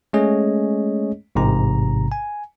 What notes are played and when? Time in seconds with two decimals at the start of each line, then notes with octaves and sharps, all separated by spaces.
0.13 G#3 A3 C#4 G#4 C#5 D#5
1.35 A1 G#2 C3 A#5
2.12 G#5